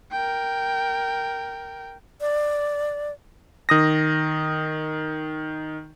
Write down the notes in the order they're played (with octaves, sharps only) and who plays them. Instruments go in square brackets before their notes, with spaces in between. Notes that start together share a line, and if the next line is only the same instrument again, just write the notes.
[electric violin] A#4 G5
[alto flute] D5
[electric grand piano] D#3 D#6 A#6